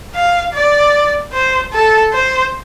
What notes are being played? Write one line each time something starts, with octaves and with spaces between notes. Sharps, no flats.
F5
D5
C5
A4
C5